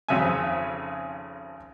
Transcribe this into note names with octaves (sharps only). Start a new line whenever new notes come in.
G#1 F2 C#3 E5 G#5